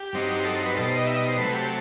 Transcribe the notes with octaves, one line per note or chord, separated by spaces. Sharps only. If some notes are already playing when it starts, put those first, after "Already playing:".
Already playing: G4
G2 F#3 C4 D#4
A4
B4
B2 G3 D#4 A4
C5
D#5
E5
D#5
C5
C3 F#3 A3 B4
G4